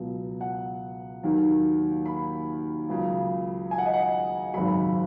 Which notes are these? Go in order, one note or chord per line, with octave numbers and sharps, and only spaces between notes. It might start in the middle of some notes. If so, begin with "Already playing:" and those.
Already playing: C#2 B2 F#3
F#5
D#2 D#3 F#3
B5
C#2 C#3 F#3
G#5
F#5
D#5
F#5
G#1 F#2 C#3 F#3 B5